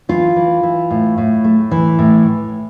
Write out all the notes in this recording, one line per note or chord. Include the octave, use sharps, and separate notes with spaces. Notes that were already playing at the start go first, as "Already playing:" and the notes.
E3 F4
E3
E3
A2
A2
A3
E3
A2